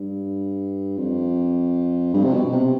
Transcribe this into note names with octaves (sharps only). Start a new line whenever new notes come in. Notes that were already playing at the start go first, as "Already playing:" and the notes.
Already playing: G2
F2
G2
C3
B2
C3